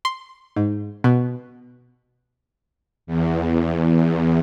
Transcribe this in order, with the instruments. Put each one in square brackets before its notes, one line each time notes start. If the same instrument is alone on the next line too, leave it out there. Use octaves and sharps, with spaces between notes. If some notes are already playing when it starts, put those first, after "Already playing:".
[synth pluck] C6
G#2
B2
[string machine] E2